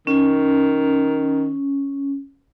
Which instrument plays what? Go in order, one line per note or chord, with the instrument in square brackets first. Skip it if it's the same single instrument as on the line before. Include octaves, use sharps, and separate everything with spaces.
[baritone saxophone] D#3 [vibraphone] C#4